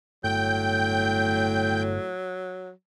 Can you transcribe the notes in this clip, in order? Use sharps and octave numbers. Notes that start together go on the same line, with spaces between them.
G1 A2 F#3 G5 G6